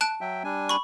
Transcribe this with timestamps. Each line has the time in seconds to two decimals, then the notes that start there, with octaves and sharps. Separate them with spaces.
0.01 A5 F#6 D7
0.21 F#3 E5 G5
0.44 G3 D4 G#5
0.69 B5 C#6